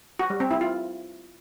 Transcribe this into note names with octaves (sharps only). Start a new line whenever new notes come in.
F#4
G3
C4
E4
F4